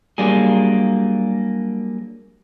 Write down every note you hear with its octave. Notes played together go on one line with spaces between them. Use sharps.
F#3 G3 A#3 D4 G#4